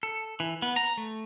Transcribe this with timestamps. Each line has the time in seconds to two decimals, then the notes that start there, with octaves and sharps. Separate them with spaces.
0.03 A4
0.40 E3
0.62 B3
0.76 A#5
0.97 A3